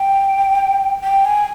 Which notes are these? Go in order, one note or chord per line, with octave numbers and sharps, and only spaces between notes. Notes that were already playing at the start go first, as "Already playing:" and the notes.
Already playing: G5
G5
G#5